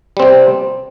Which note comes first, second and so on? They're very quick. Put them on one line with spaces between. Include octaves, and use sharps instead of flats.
G3 C4 C3